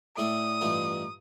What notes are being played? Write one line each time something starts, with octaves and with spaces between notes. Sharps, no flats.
A2 A3 D4 A4 D#6
A1 G2 F3 A3 D#4